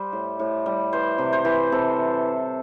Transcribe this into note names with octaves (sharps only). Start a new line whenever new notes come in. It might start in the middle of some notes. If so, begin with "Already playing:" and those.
Already playing: G3 C5
A2
A2
G3
E3 C5
C3
C5
E3
C3 A4